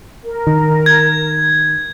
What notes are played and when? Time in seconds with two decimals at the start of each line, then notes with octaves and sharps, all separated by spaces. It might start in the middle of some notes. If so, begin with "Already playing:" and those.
0.23 A#4
0.47 D#3
0.86 G#6